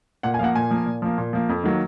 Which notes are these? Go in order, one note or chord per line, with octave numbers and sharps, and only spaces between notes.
A#2 F#5
G#5
F3 A#3 F5 F#5
A#2 G#5
F3 A#3
A#2
F3 A#3
A#2
F3 A#3
F2
D#3 F#3 A#3